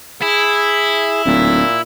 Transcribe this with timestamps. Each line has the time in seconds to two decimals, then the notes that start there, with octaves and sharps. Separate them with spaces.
0.22 E4 G#4
1.26 D1 A#2